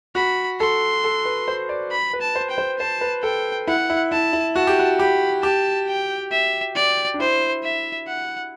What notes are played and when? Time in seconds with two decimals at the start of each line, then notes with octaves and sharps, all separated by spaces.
0.15 F#4 B5
0.60 A4 C6
1.04 A4
1.25 B4
1.48 C5
1.69 D5
1.92 B5
2.13 B4
2.21 A5
2.35 C5
2.50 G5
2.58 C5
2.79 C5 A5
3.01 B4
3.23 A4 G5
3.68 E4 F#5
3.90 E4
4.12 E4 A5
4.33 E4
4.56 F#4 A5
4.67 G4
4.79 F#4
4.99 G4 B5
5.43 G4 A5
5.88 G5
6.31 E5
6.76 D5
7.14 D4
7.19 E4 C5
7.64 E5
8.08 F#5